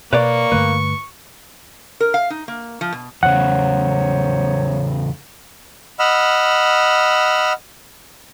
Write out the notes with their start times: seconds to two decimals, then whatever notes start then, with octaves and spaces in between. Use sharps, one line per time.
0.13 B2 A#3 B4 C#5 D5 C#6
0.52 G2 D3 A3 B4
2.00 A#4
2.14 F5
2.30 D#4
2.48 A#3
2.81 F3
2.92 B2
3.23 E2 C#3 F#3 C5 C#5 F#5
5.99 D#5 F#5 B5 E6 F6